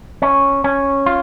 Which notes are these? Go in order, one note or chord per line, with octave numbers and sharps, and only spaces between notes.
C#4
C#4
F4